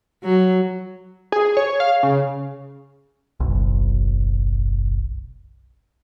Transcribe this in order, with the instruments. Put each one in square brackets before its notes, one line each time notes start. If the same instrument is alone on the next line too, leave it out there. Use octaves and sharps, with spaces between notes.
[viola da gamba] F#3
[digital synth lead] G#4
C#5
F5
C#3
[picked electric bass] F#1 B1